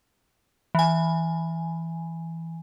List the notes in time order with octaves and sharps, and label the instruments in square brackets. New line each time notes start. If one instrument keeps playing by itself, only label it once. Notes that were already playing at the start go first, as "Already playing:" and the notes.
[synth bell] E3 G#5